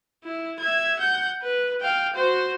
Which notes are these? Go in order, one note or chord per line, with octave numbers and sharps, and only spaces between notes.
E4
E5 G#6
F#5 G6
B4
F5 G5
F#4 C5